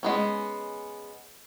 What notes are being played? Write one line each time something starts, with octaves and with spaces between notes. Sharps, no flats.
G#3 B3 C#4